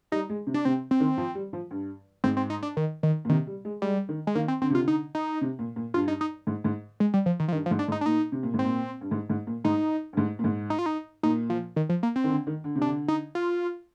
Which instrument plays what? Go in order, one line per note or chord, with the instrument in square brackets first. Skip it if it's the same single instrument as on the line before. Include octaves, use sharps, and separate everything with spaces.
[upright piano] G3 [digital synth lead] D#4
[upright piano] G#3
C3
[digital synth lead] D4
[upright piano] C3 [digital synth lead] C4
[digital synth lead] C4
[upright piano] D#3
F3
G3
F3
G2
[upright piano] G#2 [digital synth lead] C4
[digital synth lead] C4
D#4
D4
D#3
D#3
[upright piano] A#2
[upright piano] C3 [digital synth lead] D#3
[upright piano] G3
G#3
[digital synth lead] G3 [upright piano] G#3
[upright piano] D#3
[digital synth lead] G#3
[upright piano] D#3 [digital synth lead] A#3
[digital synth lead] C4
[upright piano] D3 [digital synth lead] C4
[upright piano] C3
[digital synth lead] F4
[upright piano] D3
[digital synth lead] D#4
D#4
[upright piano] C3
A#2
A#2
[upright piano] G2 [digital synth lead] F4
[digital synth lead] D#4
D#4
[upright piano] G#2
G#2
[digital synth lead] G#3
G3
F3
D#3
F3
[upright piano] G2 [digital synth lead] D#3
[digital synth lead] F3
[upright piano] G#2
[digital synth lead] D4
[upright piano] G#2
[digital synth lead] D#4
D4
[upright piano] A#2 [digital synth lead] D#4
[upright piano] C3
A#2
G#2
[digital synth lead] C4
[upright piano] A#2
G2
G#2
G#2
A#2
[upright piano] G#2 [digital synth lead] D#4
[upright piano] G2
G#2
A#2
G#2
[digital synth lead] D#4
F4
D#4
[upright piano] A#2 [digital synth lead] D#4
[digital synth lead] F3
D#3
F3
A#3
C4
[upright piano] D#3
D3
D#3
D3
C3
[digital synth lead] D4
[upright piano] D3
[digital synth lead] D#4
F4